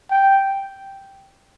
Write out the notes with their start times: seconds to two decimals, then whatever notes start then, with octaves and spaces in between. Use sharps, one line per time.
0.11 G5